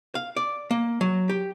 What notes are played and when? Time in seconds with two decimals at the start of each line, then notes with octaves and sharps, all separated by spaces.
0.15 F5
0.37 D5
0.71 A#3
1.01 F#3
1.29 G4